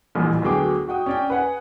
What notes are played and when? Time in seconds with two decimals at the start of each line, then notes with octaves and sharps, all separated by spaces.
0.15 D#1 A1 A#2
0.42 D2 F#3 B3 G#4 G5 D6
0.88 F#4 F#5 G5 D#6
1.06 C#4 D5 G5
1.30 B4 F#5 G#5